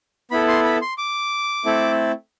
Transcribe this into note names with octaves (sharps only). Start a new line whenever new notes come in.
B3 E4 A4 B5
C6
B5
C6
D6
A3 C4 E4 A4